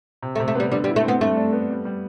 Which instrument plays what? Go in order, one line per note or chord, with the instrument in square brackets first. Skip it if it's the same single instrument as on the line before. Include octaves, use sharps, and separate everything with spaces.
[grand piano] C3
[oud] A3
[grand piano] C3
[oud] A3
[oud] G3 [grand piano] B3
[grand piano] D3 [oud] G3
[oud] G3
[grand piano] E4
[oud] A3
[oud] B3 [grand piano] C4
[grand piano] G2 [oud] A3
[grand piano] D4
B3
G3
G3